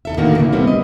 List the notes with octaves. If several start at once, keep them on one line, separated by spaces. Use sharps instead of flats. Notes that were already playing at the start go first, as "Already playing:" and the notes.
D#2 A4 E5
A2 D3 D#3 A3 A#3 F#4
A2 C#3 E3
G3 B3 C4
D#5